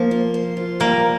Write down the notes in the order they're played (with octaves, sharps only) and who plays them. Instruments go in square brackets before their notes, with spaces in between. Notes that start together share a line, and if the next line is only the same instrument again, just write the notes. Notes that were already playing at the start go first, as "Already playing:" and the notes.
Already playing: [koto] F3 [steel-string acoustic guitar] A#3
[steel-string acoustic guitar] F4
C5
F4
[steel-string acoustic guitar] G3 [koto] A#3